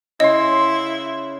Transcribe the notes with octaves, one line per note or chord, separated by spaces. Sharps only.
C#3 E4 D#5 C6